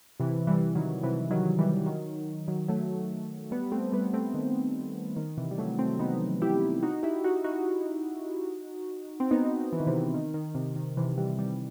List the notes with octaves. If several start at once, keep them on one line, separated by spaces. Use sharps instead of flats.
C3 E3
E3 G3
D#3 F#3
C3 E3
D#3 F#3
E3 G3
D#3 F#3
D#3 F#3
F#3 A3
G3 B3
A3 C4
G3 B3
A3 C4
D#3
D#3
C3 E3
G3
F#3 A3
A3 C4
B3 D#4
E4 G4
D#4 F#4
E4 G4
D#4 F#4
D#4 F#4
C4
B3 D#4
E3
D#3
C3 E3
D#3
D#3
C3
D#3
C3 E3
E3 G3
E3 G3